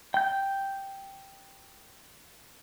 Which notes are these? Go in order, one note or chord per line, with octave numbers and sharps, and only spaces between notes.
G5 G6